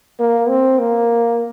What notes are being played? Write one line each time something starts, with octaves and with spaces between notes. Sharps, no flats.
A#3
C4
A#3